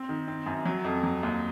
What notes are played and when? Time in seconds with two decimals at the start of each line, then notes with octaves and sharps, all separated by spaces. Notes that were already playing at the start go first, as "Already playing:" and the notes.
Already playing: C4
0.09 D#3
0.28 C4
0.46 F#2
0.66 F#3
0.84 F2
1.04 F#3
1.23 D#2